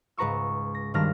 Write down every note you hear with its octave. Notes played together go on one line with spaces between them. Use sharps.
C#2 G#2 B4 A#5 C#6 E6
A#6
G#1 G2 D#3 D4 F6 A#6